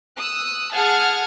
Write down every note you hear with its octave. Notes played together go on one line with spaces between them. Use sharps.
D#6 E6 F#6
G#4 F#5 A5 F6 G#6